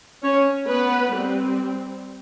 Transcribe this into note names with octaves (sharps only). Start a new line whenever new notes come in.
C#4 C#5
B3 B4
G3 C4